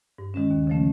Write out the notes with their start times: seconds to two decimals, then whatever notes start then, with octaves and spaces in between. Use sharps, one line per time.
0.18 G2
0.34 D#3 G#3 C#4
0.51 D#2
0.67 C#3 F3 A3 C#4